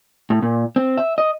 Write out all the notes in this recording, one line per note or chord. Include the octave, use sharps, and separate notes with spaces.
A2
A#2
C4
E5
D#5